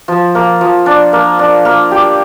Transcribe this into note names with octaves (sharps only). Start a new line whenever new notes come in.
F3
A#3
F3
D4
A#3
D4
A#3
G4